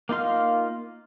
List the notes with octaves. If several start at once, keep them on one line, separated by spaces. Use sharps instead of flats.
A#3 D#4 F4 C6 F6